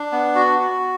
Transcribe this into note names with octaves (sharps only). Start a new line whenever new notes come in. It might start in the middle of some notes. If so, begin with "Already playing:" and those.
Already playing: D4
B3
F#4
F#4